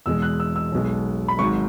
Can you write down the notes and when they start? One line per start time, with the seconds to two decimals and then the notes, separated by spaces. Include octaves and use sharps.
0.06 E2 B2 G#3 E6
0.22 F#6
0.40 E6
0.56 E6
0.72 B1 B2 G#3
1.28 B5
1.39 G#1 G#2 F#3 C#6